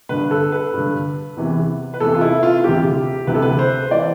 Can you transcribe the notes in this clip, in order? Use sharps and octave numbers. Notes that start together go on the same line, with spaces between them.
G2 D3 B4
A4
B4
G2 D3
E2 C3 E3
B4
E2 C3 E3 A4
F4
E4
F4
F4
D2 C3 E3 G4
D2 C3 E3 B4
A4
B4
C5
E3 D5